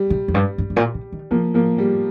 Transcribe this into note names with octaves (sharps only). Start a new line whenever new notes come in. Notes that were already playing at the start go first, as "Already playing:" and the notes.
Already playing: G3
C3
F2
G2
G2
G2
A#2
C3
D#3
C3 F3 A#3
F3 A#3
G3